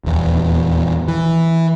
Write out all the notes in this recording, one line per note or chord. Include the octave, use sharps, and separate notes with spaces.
D#1 E2
E3